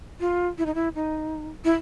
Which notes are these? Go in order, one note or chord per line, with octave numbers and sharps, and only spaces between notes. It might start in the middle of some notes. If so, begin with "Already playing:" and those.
F4
E4
D#4
E4
D#4
E4